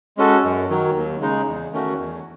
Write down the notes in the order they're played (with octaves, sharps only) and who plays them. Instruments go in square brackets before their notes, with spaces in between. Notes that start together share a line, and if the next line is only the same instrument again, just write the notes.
[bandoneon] G#3 C#4 F#4 A4
F#2
D#3 F#3
D#2
C#3 G#3 D#4
E2
D#3 A3 C#4 F#4
E2